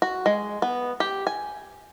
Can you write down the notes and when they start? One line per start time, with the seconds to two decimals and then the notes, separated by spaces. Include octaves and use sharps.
0.02 F#4
0.26 G#3
0.62 B3
1.00 G4
1.27 G#5